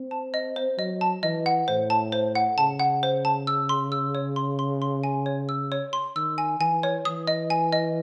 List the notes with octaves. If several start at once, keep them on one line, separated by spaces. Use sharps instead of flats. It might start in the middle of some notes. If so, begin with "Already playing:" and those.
Already playing: C4
A5
D#5
C5
F#3 D#5
A5
E3 D#5
F#5
A2 C5
A5
C5
F#5
C#3 A5
F#5
C5
A5
E6
C6
E6
C#5
C6
C6
C6
G#5
C#5
E6
C#5
C6
D#3 E6
G#5
E3 G#5
C#5
E3 D#6
D#5
G#5
D#5